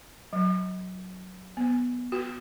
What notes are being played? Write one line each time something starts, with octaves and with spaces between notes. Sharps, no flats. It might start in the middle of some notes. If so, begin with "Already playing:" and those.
F#3
B3
F#4